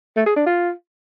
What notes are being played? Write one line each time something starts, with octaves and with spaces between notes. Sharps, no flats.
A3
G#4
D4
F4